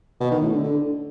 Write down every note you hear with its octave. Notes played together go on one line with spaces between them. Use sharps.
B2
D#3
A2
D3
D3